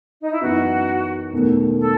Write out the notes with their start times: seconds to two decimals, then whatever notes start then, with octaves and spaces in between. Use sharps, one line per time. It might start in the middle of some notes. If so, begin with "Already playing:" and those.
0.22 D#4
0.31 E4
0.41 F#2 E3 B3 D#4 F#4
1.32 E1 E2 D#3 A3
1.79 A4